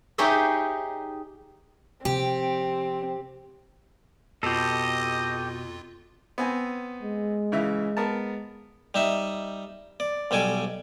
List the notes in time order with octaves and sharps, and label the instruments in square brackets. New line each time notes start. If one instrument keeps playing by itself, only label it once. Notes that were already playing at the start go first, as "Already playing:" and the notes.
[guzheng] D#4 G4 G#4 C#5 D#5 E5
[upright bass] C3 F3 [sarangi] C4 [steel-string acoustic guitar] G4
[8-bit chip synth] F2 F4 [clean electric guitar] B2 [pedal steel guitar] G4 A4 [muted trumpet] D#5
[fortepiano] B3 C4 G#5
[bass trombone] G#3
[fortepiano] C#3 E3 E5
B3 A#4 A5
[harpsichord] G3 D#4 E5
D5
B1 G3 A4 G#5 D6